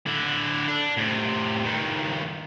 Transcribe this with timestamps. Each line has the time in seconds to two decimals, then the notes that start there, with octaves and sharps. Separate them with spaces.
0.06 D3 E4
0.68 D4
0.98 A2 C3
1.65 G2 D#3